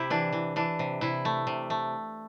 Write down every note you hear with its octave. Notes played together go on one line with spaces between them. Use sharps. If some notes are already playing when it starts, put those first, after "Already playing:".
Already playing: C3 E4 G4
E3 D4
E3
E3 D4
C3
C3 E4
A3
C3
A3